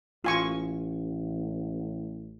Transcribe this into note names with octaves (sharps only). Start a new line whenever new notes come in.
A1 F4 G#5 C#6